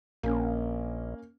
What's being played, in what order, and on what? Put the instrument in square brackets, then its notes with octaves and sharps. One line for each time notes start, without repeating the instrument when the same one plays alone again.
[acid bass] A#1 [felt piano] A#3 C#4